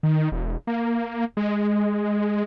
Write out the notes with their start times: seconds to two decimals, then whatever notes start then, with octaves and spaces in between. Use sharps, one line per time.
0.03 D#3
0.32 E1
0.67 A#3
1.37 G#3